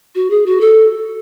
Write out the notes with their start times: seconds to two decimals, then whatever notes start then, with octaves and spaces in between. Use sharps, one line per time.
0.15 F#4
0.30 G#4
0.46 F#4
0.61 A4